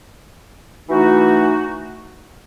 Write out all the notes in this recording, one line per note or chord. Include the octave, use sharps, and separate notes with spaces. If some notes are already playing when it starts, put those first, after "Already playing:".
E3 A3 D#4 F#4